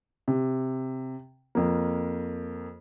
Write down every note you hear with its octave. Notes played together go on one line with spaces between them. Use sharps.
C3
F2 A#3